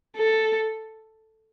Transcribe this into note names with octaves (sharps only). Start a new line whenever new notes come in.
A4